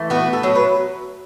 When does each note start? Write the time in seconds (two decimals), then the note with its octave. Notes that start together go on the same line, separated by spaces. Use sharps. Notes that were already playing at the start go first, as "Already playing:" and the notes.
Already playing: E3 A3
0.10 B3 F#4
0.33 A4
0.43 F#3
0.55 B4